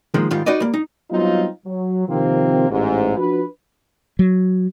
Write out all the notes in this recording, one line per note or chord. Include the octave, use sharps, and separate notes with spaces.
D#3 F3 G#3 A#3
G#2 D#3 G3 F4
D#4 F#4 B4 D5 D#5
G3 A#3
D#4
F#3 G3 B3 C4 D#4 F4
F#3
C3 D#3 F3 A#3 C4
A1 G#2
F3 D4 F#4 B4
F#3